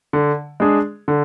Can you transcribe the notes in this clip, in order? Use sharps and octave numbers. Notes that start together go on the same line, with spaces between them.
D3
G#3 D4 G#4
D3